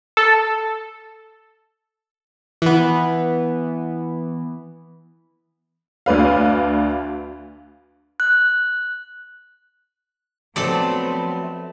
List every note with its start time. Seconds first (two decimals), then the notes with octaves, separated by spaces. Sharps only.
0.17 A4
2.62 E3 B3
6.06 D2 D4 B4 F5
8.20 F#6
10.56 F3 F#3 A3 B3 C4 A4 D5